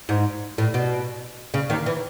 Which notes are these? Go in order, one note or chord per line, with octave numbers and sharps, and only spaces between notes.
G#2
A2
B2
C#3
D#2 D#3
E3